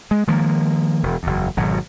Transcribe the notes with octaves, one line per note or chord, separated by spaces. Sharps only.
G#3
D#3 F3 G#3 A#3
E1
F#1 E2
G#1 B2 F#3